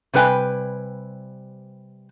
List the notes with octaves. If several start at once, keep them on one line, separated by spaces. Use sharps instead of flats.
C3 G3 B4 G5 G#5